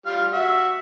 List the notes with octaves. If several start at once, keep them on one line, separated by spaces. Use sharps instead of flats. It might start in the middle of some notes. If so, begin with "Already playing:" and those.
G3 F4 F6
F#4 E5